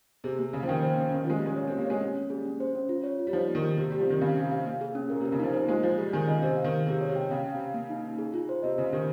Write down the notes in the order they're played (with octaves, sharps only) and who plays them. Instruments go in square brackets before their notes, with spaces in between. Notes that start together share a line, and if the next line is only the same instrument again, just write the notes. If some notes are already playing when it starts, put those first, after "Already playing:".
[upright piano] C3 [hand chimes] G#4
[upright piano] C3 [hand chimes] A#3
[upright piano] C#3 [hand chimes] A#3
[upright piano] F3
[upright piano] D#3 [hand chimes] G5
[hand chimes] C5
C#4
[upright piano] D#3 [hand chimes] C#4
[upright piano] F3
[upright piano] G#3 [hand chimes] F4
[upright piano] G3
[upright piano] G#3 [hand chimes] C#4
[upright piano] A#3 [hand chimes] C#5
[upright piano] C4
[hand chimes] G4
[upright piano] A#3
[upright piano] G#3 [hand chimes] C#5
[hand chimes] C#4
A#3
[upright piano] G3 [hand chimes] G#4
[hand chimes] C#4
C5
C#4
F4
C#5
F4
[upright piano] G3
[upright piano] F3 [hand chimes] D#4
[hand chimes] A#3
[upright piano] D#3
[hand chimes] G4
[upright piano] C3 [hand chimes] G4
[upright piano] G3 [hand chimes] G4
[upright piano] F3
[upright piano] D#3 [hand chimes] C4
[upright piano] C#3 [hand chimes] F5
[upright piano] C3 [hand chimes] F5
[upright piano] C3 [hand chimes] F5
[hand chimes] A#3
G#4
C#4
[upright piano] A#2 [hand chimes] A#4
[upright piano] C3
[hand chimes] A#4
[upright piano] C#3
[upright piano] F3 [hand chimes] D#4
[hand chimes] C5
[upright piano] A#3
[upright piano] G#3 [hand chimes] F4
[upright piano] F3 [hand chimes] F4
[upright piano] G3 [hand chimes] G#4
[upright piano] D#3 [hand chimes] G#5
[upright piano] C#3 [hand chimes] D#5
[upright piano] C3 [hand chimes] C5
[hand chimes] F5
[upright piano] D#3
[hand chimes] F5
[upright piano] C3 [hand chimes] G#4
[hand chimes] C#5
[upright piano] C3
[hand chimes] G5
[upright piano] C#3 [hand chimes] F5
[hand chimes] F5
[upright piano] C3
[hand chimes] F5
A#3
D#4
D#4
G#4
F4
C5
[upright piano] C3 [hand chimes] D#5
[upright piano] C#3 [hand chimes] C5
[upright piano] D#3 [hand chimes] G4